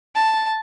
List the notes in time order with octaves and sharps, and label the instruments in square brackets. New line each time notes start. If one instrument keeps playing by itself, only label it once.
[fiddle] A5